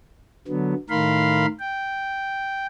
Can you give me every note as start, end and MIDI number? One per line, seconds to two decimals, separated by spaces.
0.48 0.74 50
0.48 0.74 54
0.48 0.74 59
0.90 1.46 45
0.90 1.46 51
0.90 1.46 70
0.90 1.46 77
0.90 1.46 83
0.90 1.46 84
1.59 2.66 79